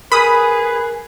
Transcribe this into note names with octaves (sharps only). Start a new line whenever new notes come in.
G#4 A#4 B4 B5 D#6